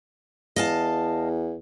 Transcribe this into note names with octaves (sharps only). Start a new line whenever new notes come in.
E2 D#5 F5 A5